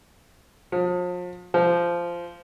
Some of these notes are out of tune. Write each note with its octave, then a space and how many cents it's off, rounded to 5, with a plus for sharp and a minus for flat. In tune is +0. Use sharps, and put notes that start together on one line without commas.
F3 +40
F3 -15